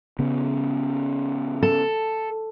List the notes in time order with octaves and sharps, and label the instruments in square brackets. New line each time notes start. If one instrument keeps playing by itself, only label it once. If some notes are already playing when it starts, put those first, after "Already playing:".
[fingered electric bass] C#3 B3 C#4
[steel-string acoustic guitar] A4